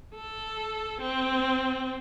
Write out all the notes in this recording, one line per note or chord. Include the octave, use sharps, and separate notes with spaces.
A4
C4